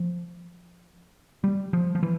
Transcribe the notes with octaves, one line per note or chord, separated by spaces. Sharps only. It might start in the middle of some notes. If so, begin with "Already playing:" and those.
Already playing: F3
G3
F3
F3
E3